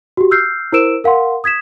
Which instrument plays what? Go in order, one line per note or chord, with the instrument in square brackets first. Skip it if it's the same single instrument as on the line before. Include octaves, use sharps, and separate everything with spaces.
[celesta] F#4 G4
E6 F6 G6 C7
E4 A#4 C5 E6 D7 E7
A#4 F5 F#5 C6
D#6 G#6 B6 E7